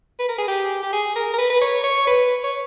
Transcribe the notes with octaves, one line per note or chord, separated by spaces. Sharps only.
B4
A#4
G#4
G4
G4
G#4
A#4
A#4
B4
B4
C#5
C#5
B4
C#5